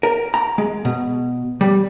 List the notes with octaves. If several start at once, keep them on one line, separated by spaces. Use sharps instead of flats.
A#4
A#5
G#3
B2
G3